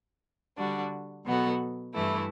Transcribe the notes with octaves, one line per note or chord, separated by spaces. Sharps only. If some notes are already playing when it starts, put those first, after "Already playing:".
D3 G3 D4 F#4
B2 F#3 B3 F#4 A4
G2 E3 A3 E4